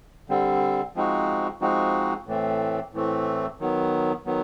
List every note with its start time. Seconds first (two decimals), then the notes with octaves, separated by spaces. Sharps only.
0.29 D3 G3 C4
0.95 F3 G#3 C4 D#4 F#4
1.61 F3 G#3 C4 D#4 F#4
2.27 A2 E3 A3 C4
2.93 A2 E3 A3 C4
3.60 D#3 F#3 B3
4.26 D#3 F#3 B3